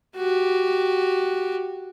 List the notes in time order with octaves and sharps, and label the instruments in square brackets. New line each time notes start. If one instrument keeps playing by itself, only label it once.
[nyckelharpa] F#4 G4